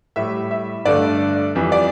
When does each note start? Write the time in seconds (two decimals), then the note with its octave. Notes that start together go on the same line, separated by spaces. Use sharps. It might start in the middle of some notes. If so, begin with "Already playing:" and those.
0.16 A2 G3 E5
0.51 E5
0.85 G2 D3 A3 D5
1.55 F2 E3 G3
1.72 D5